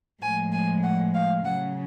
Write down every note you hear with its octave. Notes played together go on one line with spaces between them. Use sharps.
A2 F3 G#3 G#5
G#5
F#5
F5
C#3 F#3 F#5